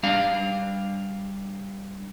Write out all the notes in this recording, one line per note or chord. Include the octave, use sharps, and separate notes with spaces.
G3 D4 F5